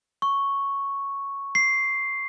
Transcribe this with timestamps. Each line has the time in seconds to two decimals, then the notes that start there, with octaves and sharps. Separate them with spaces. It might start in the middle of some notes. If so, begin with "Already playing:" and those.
0.22 C#6
1.55 C7